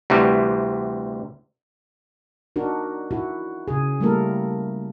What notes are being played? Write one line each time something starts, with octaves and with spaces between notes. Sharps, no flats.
D2 C3 E3 G3
D4 D#4 F#4 A#4
E4 F#4
C#3 G#4
G3 A3 A#3 E4 A4 A#4